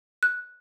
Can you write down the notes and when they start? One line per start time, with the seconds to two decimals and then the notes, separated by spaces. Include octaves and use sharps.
0.23 F#6